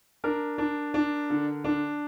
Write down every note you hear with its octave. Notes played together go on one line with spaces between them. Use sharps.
D4 A#4
D4
D4
D3
D4